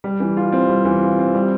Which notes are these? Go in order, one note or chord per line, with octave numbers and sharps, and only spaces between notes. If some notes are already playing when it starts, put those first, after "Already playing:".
G3
E3
F4
C4
G3
E3
F4
C4
G3